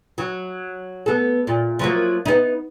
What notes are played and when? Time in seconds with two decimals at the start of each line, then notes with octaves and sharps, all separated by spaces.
0.18 F#3
1.06 B3 A4
1.47 A#2
1.79 F3 F#3 A#3
2.25 B3 D#4